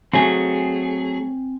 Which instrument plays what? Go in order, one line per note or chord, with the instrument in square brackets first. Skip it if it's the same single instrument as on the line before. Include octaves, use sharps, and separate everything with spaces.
[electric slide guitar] F#3 A3 G#4 [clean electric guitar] C4 G#5